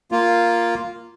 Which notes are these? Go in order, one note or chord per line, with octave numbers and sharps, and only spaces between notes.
A#3 F4